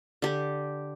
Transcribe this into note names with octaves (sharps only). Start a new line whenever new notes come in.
D3 G4